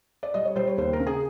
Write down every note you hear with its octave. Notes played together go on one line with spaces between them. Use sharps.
D5
G3 D#5
C#5
G3 C5
C#5
D#2 C5
A#4
C#3
G#4